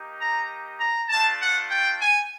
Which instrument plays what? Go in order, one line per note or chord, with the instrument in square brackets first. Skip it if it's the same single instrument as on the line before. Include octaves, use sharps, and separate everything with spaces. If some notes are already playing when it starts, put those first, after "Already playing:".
Already playing: [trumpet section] A#3 D#4 G4
A#5
A#5
A3 D4 F4 A5
F#5
G5
G#5